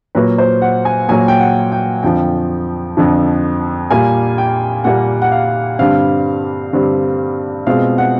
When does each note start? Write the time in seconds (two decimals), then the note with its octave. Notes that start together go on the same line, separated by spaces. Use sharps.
0.15 A#2 F#3 A#3 B4
0.38 C5
0.62 F#5
0.85 G#5
1.09 A#2 F#3 A#3 G#5
1.28 G5
1.40 F#5
1.72 G5
2.03 F2 D3 F3 G5
2.97 F2 D3 F3
3.91 A#2 G3 A#3 G#5
4.38 G5
4.84 A#2 G3 A#3 F#5
5.22 F#5
5.32 F5
5.79 G2 D3 G3 C4 F5
6.73 G2 D3 G3 C4
7.67 B2 G#3 C4 F4 F5
7.98 F#5